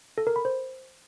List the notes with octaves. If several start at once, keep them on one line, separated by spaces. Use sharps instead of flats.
A4
A#4
B5
C5